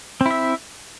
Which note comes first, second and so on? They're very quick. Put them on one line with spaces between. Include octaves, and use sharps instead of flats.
C4 E4 E5